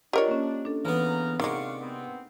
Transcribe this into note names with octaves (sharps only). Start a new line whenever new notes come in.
D4 F4 G4 A#4 C#5 D#5
A#3 C#4
D4 A4
C#3 E3 B3 A#5 F6
C3 D#3 G#3 F#4 D5 F5 C#6
B3 C4